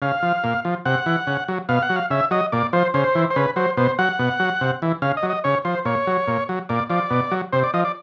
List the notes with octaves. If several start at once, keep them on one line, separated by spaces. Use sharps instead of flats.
C#3 F5
F3
A#2
F3
C3 F#5
E3
C#3
F#3
B2 F5
F#5
F#3
F5
C#3 E5
F#3 D#5
A#2 D5
F3 C5
C#3 C5
E3
C5
C#3 B4
F#3 C5
B2 C5
F#3 F#5
B2
F#3
C3
E3
C#3 F5
D#5
F#3
D#5
C#3 C#5
F3 C5
A#2 C#5
F#3
A#2
F#3
A#2 D5
F3 D5
B2
F#3
C3 C5
D5
F3 D#5
D5